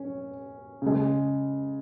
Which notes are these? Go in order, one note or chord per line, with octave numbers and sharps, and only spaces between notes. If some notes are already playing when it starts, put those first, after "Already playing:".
Already playing: C#4
C#3 G#3